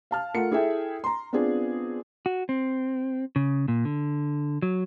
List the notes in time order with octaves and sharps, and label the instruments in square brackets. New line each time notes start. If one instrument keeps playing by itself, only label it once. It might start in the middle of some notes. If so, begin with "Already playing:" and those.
[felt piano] F5 A5 F6
A3 F4 A#4 F#5 C#7
E4 G#4 A4 E5 G5
A#5 C6
B3 C4 D4 F4 G#4
[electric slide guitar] F#4
C4
C#3
A#2
D3
F#3